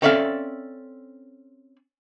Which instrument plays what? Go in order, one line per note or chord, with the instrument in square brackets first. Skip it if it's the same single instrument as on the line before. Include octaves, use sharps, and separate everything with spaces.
[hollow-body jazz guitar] C4 C#4 A4 D5 E5 F5